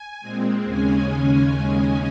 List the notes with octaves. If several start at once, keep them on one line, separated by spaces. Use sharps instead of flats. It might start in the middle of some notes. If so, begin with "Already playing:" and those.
Already playing: G#5
A#2 G#3 C4
D#2 C#3 G#3 C#4 G#5